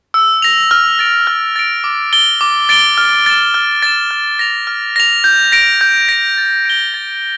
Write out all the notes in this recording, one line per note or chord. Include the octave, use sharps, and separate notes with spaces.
E6
A#6 F7
F6
A6 D7
F6
A6 D7
D6
A6 D7 G7
D6
A6 D7 G7
F6
A6 E7
F6
A6 E7
F6
A#6 F7
F6
A#6 F7
G6
A#6 D7
G6
A#6 D7
A6
D7 G7
A6